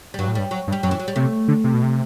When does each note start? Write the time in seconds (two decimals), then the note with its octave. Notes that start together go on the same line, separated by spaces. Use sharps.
0.14 G3
0.19 G2 F#3
0.28 A2
0.35 G2 G3
0.51 F#3
0.67 G2
0.72 G3
0.83 F#2 F#3
0.91 E3
1.00 F#3
1.08 G3
1.16 C3 A3
1.48 D3
1.64 C3
1.74 B2
1.83 C3